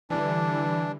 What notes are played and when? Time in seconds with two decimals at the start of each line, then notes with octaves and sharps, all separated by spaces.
0.10 D3 E3 G3 D4